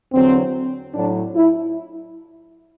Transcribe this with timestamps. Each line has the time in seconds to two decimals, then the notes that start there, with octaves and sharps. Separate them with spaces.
0.13 E2 D3 F#3 C4
0.94 A2 F#3 D4
1.35 E4